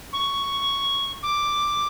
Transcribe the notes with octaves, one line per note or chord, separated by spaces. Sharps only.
C#6
D6